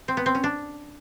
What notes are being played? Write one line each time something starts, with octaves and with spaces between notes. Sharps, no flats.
C4
B3
C4
C#4
D4